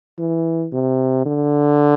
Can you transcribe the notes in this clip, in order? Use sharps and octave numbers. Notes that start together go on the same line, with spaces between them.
E3
C3
D3